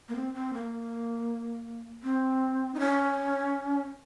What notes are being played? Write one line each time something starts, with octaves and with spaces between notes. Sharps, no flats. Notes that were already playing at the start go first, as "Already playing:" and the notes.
A#3
C4
C4
A#3
C4
D#4
C#4